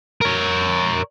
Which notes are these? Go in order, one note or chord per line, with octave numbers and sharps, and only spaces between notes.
A#4 C#5